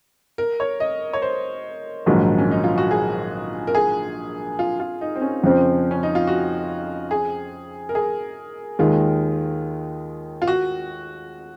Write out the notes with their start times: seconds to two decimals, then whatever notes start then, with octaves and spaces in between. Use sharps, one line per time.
0.38 A#4
0.60 C#5
0.80 D#5
1.13 C#5
1.22 C5
2.06 A#1 G#2 D#3 F#3
2.38 C#4
2.51 D#4
2.64 F4
2.78 F#4
2.91 G#4
3.67 A#4
3.75 G#4
4.59 F4
4.80 F4
5.01 D#4
5.16 C4
5.21 C#4
5.44 F2 C#3 F3 C4
5.91 C#4
6.03 D#4
6.15 F4
6.27 F#4
7.11 G#4
7.89 A#4
7.95 G#4
8.79 D#2 D#3 G#3 F4
10.42 F4
10.47 F#4